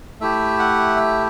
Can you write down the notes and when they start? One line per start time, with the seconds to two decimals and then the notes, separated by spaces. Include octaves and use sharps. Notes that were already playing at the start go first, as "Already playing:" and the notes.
0.21 A3 E4 G4 E5
0.59 F#5
0.96 E5